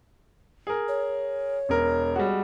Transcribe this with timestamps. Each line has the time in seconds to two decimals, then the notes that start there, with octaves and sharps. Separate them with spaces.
0.67 G#4 A#4
0.88 C#5
1.69 E1 A#4
2.16 G3 G#3 F#4